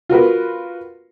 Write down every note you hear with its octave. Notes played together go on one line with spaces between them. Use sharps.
F4 F#4 A#4 B4